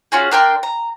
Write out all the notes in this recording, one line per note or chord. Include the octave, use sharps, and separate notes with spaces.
C#4 F4 F#4 G#4
D4 A#4 G5 C6
A#5